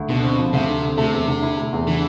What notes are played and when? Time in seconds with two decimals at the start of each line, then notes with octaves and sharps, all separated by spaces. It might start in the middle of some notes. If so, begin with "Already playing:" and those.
Already playing: D2
0.09 B2 D3
0.24 C4
0.38 F3
0.53 D2 C3
0.69 D3
0.82 C4
0.97 C3 A3
1.12 E2
1.27 D3
1.42 E4
1.57 A3
1.72 E2
1.87 D3 E3